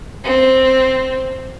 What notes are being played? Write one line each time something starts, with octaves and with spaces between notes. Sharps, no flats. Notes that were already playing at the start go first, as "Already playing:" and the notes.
C4